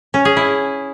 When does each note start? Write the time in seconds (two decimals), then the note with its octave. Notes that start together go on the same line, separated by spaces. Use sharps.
0.14 C#4
0.25 G#4
0.37 E4